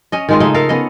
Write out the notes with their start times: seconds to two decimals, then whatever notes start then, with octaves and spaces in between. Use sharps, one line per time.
0.12 C#4 D#5
0.29 D#3 G#3 F4
0.40 C#3 A3 D#4
0.54 A4 A#4 F5
0.69 B3 C#4 D#5